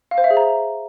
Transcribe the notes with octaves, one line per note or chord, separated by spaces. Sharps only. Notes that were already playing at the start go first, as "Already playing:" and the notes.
F5
C5
E5
G#4
A#5